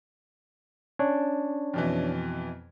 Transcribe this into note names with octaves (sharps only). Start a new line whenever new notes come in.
C#4 D4 C#5
F2 B2 E3